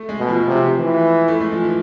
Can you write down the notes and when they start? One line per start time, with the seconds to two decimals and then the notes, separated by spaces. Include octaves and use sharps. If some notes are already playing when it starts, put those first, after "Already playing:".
Already playing: A3
0.09 G#3
0.18 B2
0.29 F3
0.48 C3
0.77 E3
1.28 A3
1.41 G#3
1.52 F3
1.64 E3